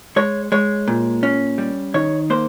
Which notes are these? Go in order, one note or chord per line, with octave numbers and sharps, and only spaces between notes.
G#3 C#5
G#3 C#5
A#2
C#4
G3
D#3 C#5
A#3 C5